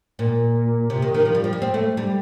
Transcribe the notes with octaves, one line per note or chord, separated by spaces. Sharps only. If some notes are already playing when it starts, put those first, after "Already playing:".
A#2
C3
D#3
D#3
F3
G3
F3
G3
C4
A3
G3